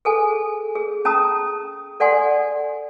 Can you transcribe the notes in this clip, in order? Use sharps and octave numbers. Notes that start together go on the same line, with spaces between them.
G#4 A4 G#5
G#4
C#4 A5 A#5 D#6
A4 D5 F#5 G#5 C6